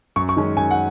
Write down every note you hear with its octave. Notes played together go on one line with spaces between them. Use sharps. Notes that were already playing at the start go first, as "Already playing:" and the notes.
F#2 C#6
C#6
D#3 G#3 C#4
F#2 G#5
F#5